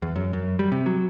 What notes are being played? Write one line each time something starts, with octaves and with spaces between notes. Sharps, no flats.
E2
F#2
F#2
G3
C3
F#3